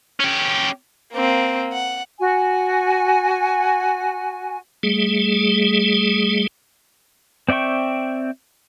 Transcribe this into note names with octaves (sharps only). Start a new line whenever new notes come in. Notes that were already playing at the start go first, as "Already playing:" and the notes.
C#4 G4
A#3 C4
F#5
F#4 G#5
G3 A3 G#4
C4 D5 E5 G5 C#6